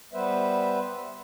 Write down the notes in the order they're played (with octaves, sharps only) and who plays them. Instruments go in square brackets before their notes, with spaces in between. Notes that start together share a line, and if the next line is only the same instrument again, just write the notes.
[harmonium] G3 B3 B4 C5 E5